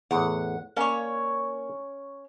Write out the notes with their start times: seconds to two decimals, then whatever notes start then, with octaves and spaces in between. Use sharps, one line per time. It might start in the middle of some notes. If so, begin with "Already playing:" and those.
0.11 E2 A2 F#5
0.77 A#3 C#4 C#5 D5 G#5